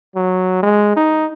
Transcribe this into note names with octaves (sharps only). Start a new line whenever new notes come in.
F#3
G#3
D#4